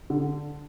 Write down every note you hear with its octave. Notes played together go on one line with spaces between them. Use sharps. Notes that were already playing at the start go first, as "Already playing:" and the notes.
D3